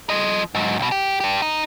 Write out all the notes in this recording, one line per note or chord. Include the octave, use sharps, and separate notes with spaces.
F3 D#5
G#2 F#3
C2 B2
G4
D4 G4
D#4